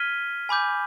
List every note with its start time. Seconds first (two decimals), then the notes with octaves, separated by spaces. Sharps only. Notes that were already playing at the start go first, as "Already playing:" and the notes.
Already playing: F6 G#6 B6 D#7 G7
0.49 G#5 B5 D6 G6